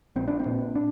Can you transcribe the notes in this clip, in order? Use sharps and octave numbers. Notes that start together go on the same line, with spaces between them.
A#1 C4
D4
C4
A#2
D4